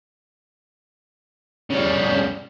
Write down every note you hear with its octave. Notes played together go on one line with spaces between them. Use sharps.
C#3 G3